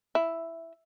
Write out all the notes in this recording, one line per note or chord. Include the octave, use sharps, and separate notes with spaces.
E4